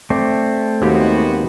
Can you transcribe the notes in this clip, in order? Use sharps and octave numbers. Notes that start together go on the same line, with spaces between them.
A3 C4 D5
D#2 D#3 G#3 B3 F#4 G4